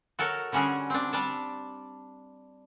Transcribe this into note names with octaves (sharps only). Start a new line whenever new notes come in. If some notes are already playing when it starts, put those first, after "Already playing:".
F#4 A4 A#4 C#5
D3 G3 C#4 F#4 G#4
C4 D4
G3 D4 A5